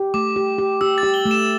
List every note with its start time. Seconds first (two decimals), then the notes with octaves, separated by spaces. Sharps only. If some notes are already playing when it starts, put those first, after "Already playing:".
Already playing: G4
0.14 A3 D6
0.36 G4
0.58 G4
0.81 G4 E6
0.98 A6
1.03 G4
1.14 G7
1.26 A3
1.31 E7